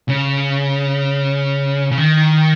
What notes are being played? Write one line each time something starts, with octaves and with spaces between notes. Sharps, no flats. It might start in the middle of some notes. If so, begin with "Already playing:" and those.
C#3
C#3
D#3